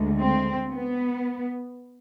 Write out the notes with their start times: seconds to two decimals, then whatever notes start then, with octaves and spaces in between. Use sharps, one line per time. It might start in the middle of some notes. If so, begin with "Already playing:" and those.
Already playing: D2 D3 G#3
0.19 C4
0.70 B3